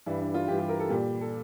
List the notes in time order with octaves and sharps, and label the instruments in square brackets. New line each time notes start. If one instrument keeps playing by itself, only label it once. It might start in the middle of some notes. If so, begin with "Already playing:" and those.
[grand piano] G2 E3 G3
D4
F4
G2 E3 G3 G4
G4
A#4
A4
A#2 G3 G4
A4